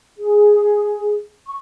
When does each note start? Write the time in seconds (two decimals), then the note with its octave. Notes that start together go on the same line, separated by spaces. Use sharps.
0.18 G#4
1.47 C#6